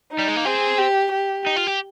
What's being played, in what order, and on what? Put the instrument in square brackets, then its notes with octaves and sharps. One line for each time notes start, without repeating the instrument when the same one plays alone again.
[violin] D#4
[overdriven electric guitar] G3
G#3
A#3
[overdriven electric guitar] C4 [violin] G#4
[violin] G4
G4
[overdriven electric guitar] D#4
F4
G4